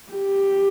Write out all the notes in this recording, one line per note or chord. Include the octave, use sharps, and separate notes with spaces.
G4